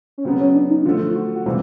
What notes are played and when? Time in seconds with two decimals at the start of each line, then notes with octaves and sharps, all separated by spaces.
0.18 C#4
0.24 C#3 F#3 B3 C4
0.40 C#4
0.55 D4
0.70 D#4
0.86 D3 F3 A3 F4
1.08 F4
1.15 F#4
1.36 F#4
1.46 C3 E3 G3 F4